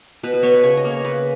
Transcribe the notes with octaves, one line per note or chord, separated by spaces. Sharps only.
B2 B4
B4
B3 C#5
B4
C#3 C#5
D#5
A#3
C#5
C#3 B4